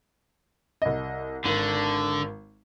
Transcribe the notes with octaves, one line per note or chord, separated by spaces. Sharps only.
C2 D#5
G#1 D3